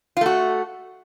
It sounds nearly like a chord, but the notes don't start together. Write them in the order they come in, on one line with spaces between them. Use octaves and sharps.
F4 A3 F#4